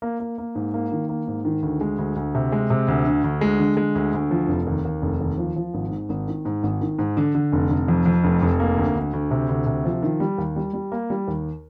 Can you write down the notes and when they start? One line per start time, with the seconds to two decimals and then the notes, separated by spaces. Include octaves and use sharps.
0.02 A#3
0.20 A#3
0.38 A#3
0.55 G#2
0.74 A#3
0.92 D#3
1.09 A#3
1.28 G#2
1.45 D#3
1.62 D2
1.81 G#3
1.98 D2
2.16 D2
2.35 C3
2.52 G#3
2.70 C3
2.88 D2
3.06 D3
3.24 D2
3.41 G#3
3.60 D3
3.77 G#3
3.95 D2
4.14 D2
4.31 F3
4.48 F1
4.67 D#2
4.85 D#2
5.02 F1
5.20 D#2
5.38 F3
5.56 F3
5.74 G#1
5.91 G#2
6.09 G#1
6.28 D#3
6.45 G#2
6.63 G#1
6.81 D#3
6.99 G#2
7.17 D3
7.35 D3
7.53 F1
7.70 F1
7.88 F2
8.06 F2
8.24 F1
8.42 F1
8.60 A#3
8.78 D2
8.95 D2
9.13 D2
9.31 C3
9.49 D2
9.66 C3
9.85 F3
10.02 D#3
10.20 G3
10.38 D#2
10.56 G3
10.73 G3
10.92 A#3
11.10 G3
11.28 D#2